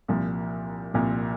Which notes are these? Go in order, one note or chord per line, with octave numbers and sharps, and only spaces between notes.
C2 A#2 F3
C2 A#2 F3